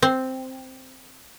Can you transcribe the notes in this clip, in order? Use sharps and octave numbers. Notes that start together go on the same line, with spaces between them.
C4